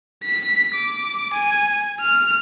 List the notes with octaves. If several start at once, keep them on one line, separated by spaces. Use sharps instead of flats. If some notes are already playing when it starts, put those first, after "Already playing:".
B6
D6
G#5
F6